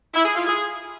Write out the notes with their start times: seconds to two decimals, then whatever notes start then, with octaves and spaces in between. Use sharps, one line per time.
0.14 E4
0.25 G#4
0.36 F4
0.46 G#4